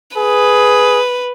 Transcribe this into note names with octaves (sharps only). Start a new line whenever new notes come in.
G#4 B4